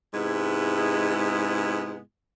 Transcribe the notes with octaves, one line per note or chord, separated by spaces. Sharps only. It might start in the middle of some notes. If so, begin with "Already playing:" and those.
G#2 C3 G#3 B3 E4